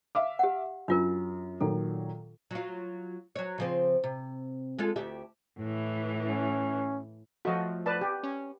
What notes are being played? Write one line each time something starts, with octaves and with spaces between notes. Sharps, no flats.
E5 F5 D6
G4 F#5
F#2 D4 F4 A#4
A#2 D#3 F#3 A4
F#3 F4
F#3 C#5
C#3 F3 C4
C3
G#3 F4 A4
D2 G4 E5
A2 E3
C#4
F3 A3 F#4 D#5
B4 D5 A5
G4
C#4